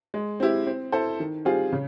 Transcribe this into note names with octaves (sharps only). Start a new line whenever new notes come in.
G#3
C4 E4 G4
C4
E4 A4 C5
D#3
G3 C4 F4 G#4
C#3